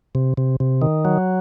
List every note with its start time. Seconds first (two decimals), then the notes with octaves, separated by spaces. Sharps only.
0.15 C3
0.37 C3
0.60 C3
0.82 D#3
1.05 F#3